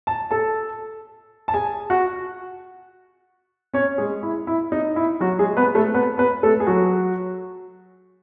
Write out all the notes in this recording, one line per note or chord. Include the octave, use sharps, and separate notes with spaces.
A5
A4 A5
A5
G#4 G#5
F#4 F#5
C#4 C#5
G#3 G#4
E4
E4
D#4
E4
F#3 F#4
G#3 G#4
B3 B4
A3 A4
B3 B4
B3 B4
A3 A4
G#4
F#3 F#4